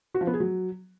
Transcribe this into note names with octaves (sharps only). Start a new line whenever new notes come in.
F#4
F3
B3
G#4
F#3